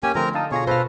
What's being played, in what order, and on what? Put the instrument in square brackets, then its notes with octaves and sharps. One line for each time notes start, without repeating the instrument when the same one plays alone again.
[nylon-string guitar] A#3 [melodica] C#4 G4 G#5
[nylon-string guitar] D3 [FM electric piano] F3 A3 [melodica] C4 A#4 A#5
[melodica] D#4 [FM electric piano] F5 A5 D#6
[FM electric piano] B2 F4 A#6 [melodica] G#4 C#5
[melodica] A4 B4 [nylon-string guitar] C5 F5